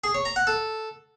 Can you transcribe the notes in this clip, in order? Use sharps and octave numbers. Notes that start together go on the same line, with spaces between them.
G#4
C#5
A#5
F#5
A4